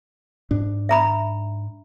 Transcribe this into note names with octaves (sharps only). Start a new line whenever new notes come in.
G#2 D4
E5 A#5 B5